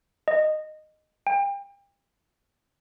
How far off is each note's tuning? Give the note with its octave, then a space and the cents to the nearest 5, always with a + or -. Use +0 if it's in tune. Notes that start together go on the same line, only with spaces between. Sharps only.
D#5 -10
G5 +35